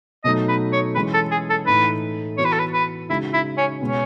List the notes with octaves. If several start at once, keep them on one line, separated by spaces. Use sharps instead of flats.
B2 F#3 A3 D#4 D#5
B4
C#5
E3 G#3 C#4 B4
A4
G#4
A4
A2 E3 A3 D#4 B4
E3 B3 F#4 C#5
B4
A4
B4
B4
C#3 G#3 D#4 E4 F#4
E4
C#4
B2 G#3 B3 C#4